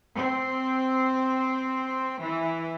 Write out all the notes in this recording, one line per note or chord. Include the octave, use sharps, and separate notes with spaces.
C4
E3